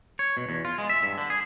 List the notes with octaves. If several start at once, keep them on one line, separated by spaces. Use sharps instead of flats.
C#5
B2
E2
F4
G#3
E5
G2
D3
G#4